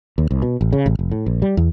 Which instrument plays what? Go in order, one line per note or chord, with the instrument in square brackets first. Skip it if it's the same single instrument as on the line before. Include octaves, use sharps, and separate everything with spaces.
[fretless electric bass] D#2
C2
B2
A1
C#3
A1
F1
A2
A#1
G3
E2